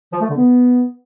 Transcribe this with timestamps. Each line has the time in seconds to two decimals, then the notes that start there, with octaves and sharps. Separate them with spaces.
0.13 F3
0.21 A3
0.29 D3
0.36 B3